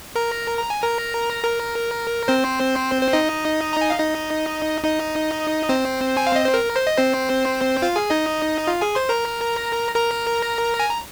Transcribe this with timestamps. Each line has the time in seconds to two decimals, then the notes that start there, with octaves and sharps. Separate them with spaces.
0.16 A#4 A#5
0.58 A#5
0.70 G#5
0.82 A#4 A#5
1.44 A#4
2.28 C4 C5
3.02 C5
3.13 D#4 D#5
3.73 A#5
3.81 G#5
3.90 F5
3.98 D#4 D#5
4.84 D#4 D#5
5.69 C4 C5
6.17 G#5
6.27 F5
6.36 D#5
6.45 C5
6.54 A#4
6.76 C5
6.87 D#5
6.98 C4 C5
7.82 F4 F5
7.96 G#4 G#5
8.10 D#4 D#5
8.67 F4 F5
8.81 G#4 G#5
8.95 C5 C6
9.09 A#4 A#5
9.95 A#4 A#5
10.80 G#5
10.89 A#5